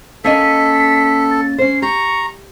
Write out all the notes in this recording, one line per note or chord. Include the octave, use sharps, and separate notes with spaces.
A#3 C#4 A4 D#5 B6
A6
C#4 C5 C7
G4 A#5 C#6